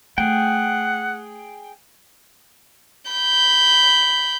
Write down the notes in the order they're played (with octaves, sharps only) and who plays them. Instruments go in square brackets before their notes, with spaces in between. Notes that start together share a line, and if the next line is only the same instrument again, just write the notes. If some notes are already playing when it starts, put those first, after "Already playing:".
[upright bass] A3 [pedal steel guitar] G#4 G5 [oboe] F#5
[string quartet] B5 G6